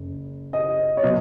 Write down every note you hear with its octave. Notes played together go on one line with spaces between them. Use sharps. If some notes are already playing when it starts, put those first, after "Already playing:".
Already playing: F#1
D#5
C#5
B2 F#3 D#5